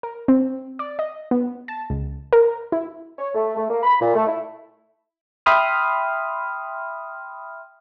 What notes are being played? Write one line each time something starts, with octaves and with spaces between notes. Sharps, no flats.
A#4
C4
D5
D#5
B3
A5
C#2
A#4
E4
C#5
A3
A3
A#3
B5
A#2
A3
E4
E5 G5 B5 C6 D#6 F6